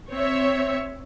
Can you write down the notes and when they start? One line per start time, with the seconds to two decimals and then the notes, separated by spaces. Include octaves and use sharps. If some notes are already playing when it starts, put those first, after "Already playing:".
0.11 C4 C#5 E5